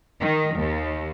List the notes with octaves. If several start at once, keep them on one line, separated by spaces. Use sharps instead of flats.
D#3
D#2